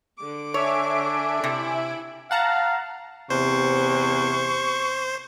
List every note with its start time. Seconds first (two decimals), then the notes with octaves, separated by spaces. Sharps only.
0.18 D3 D6
0.54 D4 C#5 E5 G#5 D7
1.44 C3 E4
2.31 F5 F#5 A5 A#5
3.30 E2 C3 C5 C#6